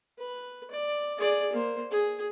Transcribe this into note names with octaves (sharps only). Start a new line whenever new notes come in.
B4
D5
G#4 D5
A#3 C5
G#4